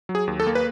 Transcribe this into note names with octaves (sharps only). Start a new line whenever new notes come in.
F#3
G#4
D#2
A4
A#3
B4